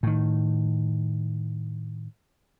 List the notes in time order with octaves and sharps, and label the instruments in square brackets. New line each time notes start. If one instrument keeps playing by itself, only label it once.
[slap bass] A2 D#3